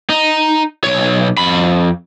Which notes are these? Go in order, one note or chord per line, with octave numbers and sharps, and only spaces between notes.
D#4
B1 C#5
F2 B5